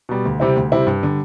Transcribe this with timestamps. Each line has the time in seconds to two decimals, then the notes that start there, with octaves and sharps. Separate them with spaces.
0.09 B2 G3
0.25 D2
0.40 C3 G3 C4 E4
0.56 D2
0.72 C3 G3 C4 E4
0.87 G2
1.03 D3 G3